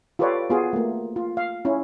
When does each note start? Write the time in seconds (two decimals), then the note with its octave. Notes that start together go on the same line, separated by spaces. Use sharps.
0.19 F4 G4 A4 B4 C#5 D5
0.50 B3 F4 F#4 G#4
0.73 A3 A#3
1.16 F4
1.37 F5
1.65 C#4 E4